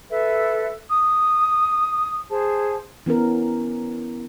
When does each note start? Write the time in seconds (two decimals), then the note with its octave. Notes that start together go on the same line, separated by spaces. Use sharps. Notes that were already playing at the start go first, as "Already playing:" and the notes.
0.10 A4 B4 E5
0.90 D#6
2.30 G#4 C5 A5
3.06 E3 B3 C#4 A#4